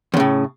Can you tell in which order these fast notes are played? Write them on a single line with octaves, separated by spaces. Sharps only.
E2 C#3 A2